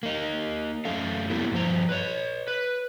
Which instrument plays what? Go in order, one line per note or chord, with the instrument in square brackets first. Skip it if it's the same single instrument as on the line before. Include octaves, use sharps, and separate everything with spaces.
[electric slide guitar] A#3 D#4
F#2 A3 C#4 A4 F5
G3 A#3 B3 E4 G4
G2 F3 C5 A#5
B4 C#5
B4